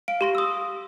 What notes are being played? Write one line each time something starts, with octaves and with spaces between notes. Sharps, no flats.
F5 D7
G4 C6 A#6
D#6 E6